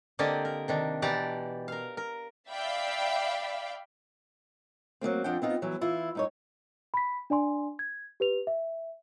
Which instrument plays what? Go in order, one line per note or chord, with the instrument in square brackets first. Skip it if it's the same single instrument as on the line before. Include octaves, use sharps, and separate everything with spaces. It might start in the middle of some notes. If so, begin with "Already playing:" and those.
[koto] D3 A#3 C4 G4 D5 D#5
A#4
C3 D#3 D4
B2 E3 G4 D5 A5 A#5
A#4 F5
A#4
[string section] D5 E5 F5 G5 B5
[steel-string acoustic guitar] F#3 G3 A#3 C4
F2 D4 F#5 G5
B3 C4 D#4 F4
E3 F#3 G3
E3 E4 F4
G2 D#4 C#5
[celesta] B5 B6
D4 D5 G#5 C6
G#6
G4 B4 F7
E5